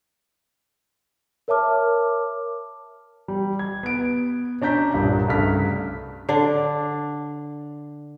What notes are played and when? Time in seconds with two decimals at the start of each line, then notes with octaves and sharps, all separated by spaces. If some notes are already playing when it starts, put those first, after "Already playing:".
1.48 A#4 C#5 E5 A5 D6 F6
3.28 G3
3.59 G#6
3.83 B3 D7
4.62 C#4 D4 A#5 G6 B6
4.94 C2 G2 A#2
5.27 C2 G2 C#3 A3 F6 B6
6.29 D3 D4